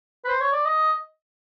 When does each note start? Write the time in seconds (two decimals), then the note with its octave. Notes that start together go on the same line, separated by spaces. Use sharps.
0.25 B4
0.28 C5
0.40 C#5
0.53 D5
0.66 D#5